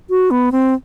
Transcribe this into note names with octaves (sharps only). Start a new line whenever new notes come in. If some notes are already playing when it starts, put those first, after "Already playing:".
F#4
B3
C4